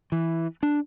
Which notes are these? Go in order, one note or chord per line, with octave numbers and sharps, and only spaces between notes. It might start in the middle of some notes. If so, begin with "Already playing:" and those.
E3
D4